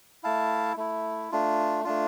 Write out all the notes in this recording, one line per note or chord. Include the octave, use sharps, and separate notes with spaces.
A3 E4 F5 A5
A3 E4
A3 D4 F4
A3 D4 F4